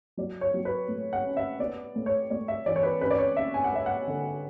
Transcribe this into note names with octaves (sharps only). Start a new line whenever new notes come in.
F#3 D5
C#5
F#3
B4
A2
F#5
C#4
E5
B3 D5
A2
C#5
A2 D5
E5
E3 D5
C#5
B4
C#4 B4
D5
C#5
C#4 E5
G#5
F#5
G#3 E5
F#5
D3